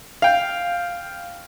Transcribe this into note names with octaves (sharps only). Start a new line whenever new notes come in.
F5 G5